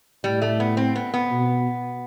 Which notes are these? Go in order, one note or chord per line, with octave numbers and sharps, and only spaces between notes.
A2 G3
A3
B3
C4
B3
B3
B2